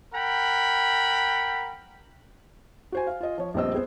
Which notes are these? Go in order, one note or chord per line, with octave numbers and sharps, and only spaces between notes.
A#4 F#5 G5 B5
F#4 C5 G#5
F5
F4 D#5
F3 C#5
A#1 G3 B3 C4 D#5 E6
B3 G#4 C5